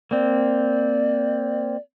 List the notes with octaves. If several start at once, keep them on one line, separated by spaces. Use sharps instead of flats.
A#3 C4 D5